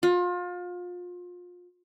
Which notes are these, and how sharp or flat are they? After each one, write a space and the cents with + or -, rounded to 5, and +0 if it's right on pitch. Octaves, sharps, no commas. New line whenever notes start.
F4 +30